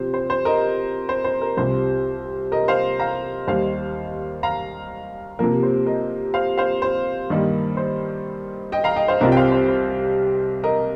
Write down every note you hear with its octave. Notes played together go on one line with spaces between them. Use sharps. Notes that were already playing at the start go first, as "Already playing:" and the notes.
Already playing: C3 F3 C5
C5
C5
A#4 D#5
C5
C5
A#4
C2 C3 F3 C5
A#4 D#5
C5 F5
F5 A#5
D#2 D#3 G3 C5 F5
F5 A#5
C3 F3 A#3 A#4
C5
A#4 D#5
C5 F5
C5 F5
C5
G2 D#3 G3 A#3
C5
D#5 G5
F5 A#5
D#5 G5
C5 F5
C2 C3 G3 C4 F4 A#4 D#5
G5
C5 F5
C5
C5
A#4 D#5